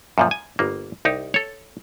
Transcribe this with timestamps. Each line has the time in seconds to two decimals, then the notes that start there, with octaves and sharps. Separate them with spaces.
0.18 F#2 A#2 F3
0.31 G#5
0.59 G1 A#3
1.05 C2 D#4 G4
1.34 A4 C#5